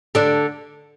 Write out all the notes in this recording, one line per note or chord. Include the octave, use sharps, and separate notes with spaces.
D3 D4